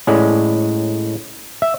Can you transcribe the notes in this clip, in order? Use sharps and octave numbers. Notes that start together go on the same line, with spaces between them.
A2 G#3 C#4 D5
E5